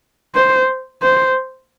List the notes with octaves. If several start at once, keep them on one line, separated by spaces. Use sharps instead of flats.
C5
C5